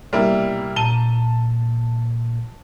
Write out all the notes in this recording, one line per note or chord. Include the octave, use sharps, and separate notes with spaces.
C2 B2 G3 A#3 E4
A#2 A5 A#5 D#7 G7